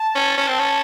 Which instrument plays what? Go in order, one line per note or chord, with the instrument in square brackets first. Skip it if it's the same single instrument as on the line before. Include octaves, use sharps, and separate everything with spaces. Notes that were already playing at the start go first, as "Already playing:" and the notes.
Already playing: [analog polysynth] A5
[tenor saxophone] C#4
C#4
C4
C#4